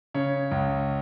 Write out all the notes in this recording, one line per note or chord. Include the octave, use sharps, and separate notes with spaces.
C#3 C#5
C#2